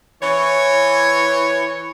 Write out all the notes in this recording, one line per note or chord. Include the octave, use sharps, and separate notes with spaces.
E3 C#5